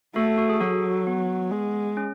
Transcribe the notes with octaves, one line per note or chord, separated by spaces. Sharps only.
A3 F#4 A4
F#4
G#4
F#3 F#4 A4
B3
G#3
C#4